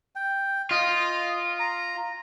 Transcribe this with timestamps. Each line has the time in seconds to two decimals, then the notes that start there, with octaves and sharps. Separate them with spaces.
0.15 G5
0.71 F4 D#5
1.59 A#5